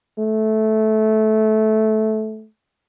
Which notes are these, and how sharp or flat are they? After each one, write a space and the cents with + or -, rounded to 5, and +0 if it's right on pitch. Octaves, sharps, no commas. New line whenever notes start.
A3 -15